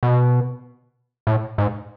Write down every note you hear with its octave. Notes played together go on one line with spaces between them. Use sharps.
B2
A2
G#2